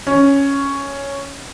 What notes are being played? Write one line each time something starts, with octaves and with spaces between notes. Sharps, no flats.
C#4